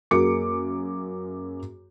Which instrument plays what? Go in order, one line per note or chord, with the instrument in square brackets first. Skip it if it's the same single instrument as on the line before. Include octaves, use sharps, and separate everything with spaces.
[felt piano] F#2 A#3 F#4 G#4 D6 C#7